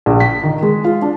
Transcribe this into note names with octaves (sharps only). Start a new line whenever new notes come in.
A#1
B6
D#3
G#3
F4
D4